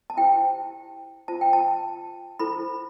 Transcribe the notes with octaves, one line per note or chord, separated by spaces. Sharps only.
A5
E4 G4 C5 G5
F4 C5 A5
G5
A5
E4 A4 C5 B5